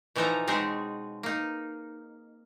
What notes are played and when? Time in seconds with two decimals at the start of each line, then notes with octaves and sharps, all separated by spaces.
0.16 B2 E3 F3 D#4 A4 A#5
0.47 B2 G#3 C4 C#4 D#4 G#4
1.23 A#3 D#4